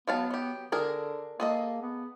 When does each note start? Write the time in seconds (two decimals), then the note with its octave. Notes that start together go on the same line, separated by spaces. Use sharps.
0.08 F#3 B3 F5 A5
0.31 F#3 G4
0.72 D3 D4 G#4 A#4
1.40 A#3 G#4 A4 D#5
1.82 B3